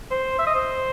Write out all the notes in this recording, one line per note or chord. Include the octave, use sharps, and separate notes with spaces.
C5
E5
D#5
C5